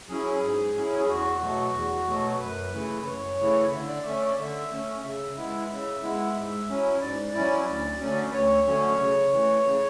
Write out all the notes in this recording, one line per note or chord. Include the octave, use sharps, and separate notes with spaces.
F#3 C#4 E4 G#4
G#2
F#3 C#4 E4
G#4
E2 F#4
B2 F#3 A3
E2
B2 F#3 A3
F#2 B4
C#3 E3 A3 E4
B4
F#2 C#5
C#3 E3 A3 E4
D3 E5
D5
A3 C#4 E5
D5
D3 E5
A3 C#4
C#3 E5
G#3 B3 E4
C#3
G#3 B3 E4
G#2
F#3 C#4 E4
G#2 D5
F#3 C#4 E4
D2
D3 F#3 A3 C#4
B4
D2 C#5
D3 F#3 A3 C#4
C#3
E3 A3
C#3